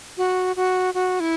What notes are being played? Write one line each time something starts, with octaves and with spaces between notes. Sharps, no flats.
F#4
F#4
F#4
E4